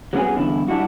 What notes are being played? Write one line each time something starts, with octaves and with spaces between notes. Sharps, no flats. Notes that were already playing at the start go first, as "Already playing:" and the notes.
F#3 G3 B3 C#4 F#4 G#4
E2 G2 D3 E4
G3 D4 E4 F#4